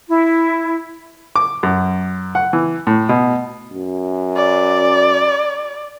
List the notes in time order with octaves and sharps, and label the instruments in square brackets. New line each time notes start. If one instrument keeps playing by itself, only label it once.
[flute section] E4
[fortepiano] D6
F#2
F#5
E3
A2
B2
[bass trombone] F#2
[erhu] D5